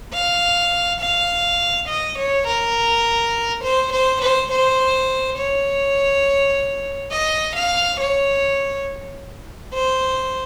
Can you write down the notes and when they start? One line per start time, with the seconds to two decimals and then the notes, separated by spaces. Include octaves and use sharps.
0.13 F5
1.01 F5
1.88 D#5
2.18 C#5
2.47 A#4
3.64 C5
3.92 C5
4.22 C5
4.51 C5
5.38 C#5
7.12 D#5
7.55 F5
8.00 C#5
9.73 C5